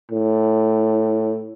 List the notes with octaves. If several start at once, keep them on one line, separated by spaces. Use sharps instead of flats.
A2